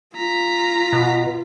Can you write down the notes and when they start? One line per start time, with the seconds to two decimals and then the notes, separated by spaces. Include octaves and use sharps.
0.16 F4 A#5 B6
0.93 B2